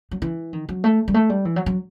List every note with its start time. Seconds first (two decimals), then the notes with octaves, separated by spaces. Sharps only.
0.11 F#3
0.22 E3
0.53 D#3
0.69 F#3
0.84 A3
1.08 G3
1.14 A3
1.30 G3
1.45 E3
1.56 F#3
1.66 F#3